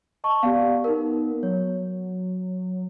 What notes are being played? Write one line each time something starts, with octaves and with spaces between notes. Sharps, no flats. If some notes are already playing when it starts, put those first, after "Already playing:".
D#5 A5 C#6
B3 G4 D5 F5
D#4 A#4
F#3 C#5